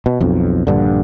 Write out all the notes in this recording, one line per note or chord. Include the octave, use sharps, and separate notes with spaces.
B2
B1 F2
A#1 G2 D3